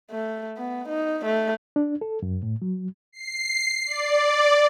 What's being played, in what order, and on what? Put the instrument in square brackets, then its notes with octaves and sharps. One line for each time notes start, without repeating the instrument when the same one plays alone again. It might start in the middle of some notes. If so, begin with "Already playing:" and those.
[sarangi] A3
B3
D#4
A3
[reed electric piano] D4
A4
F#2
A2
F#3
[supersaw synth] C7
D5